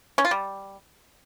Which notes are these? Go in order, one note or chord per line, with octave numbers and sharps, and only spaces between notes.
C#4
F4
G3